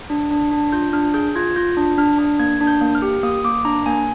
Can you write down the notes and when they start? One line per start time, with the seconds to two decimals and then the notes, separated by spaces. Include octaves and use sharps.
0.10 D4
0.31 D4
0.51 D4
0.72 F4 G6
0.93 D4 F6
1.14 G#4 G6
1.35 F4 G#6
1.56 F4 G6
1.77 D4
1.98 D4 F6
2.19 D4
2.39 A#3 G#6
2.61 D4
2.67 G6
2.81 A#3
2.95 F6
3.02 G4
3.23 A#3 D#6
3.44 A#3 D6
3.65 D4 A#5
3.86 A#3 G#5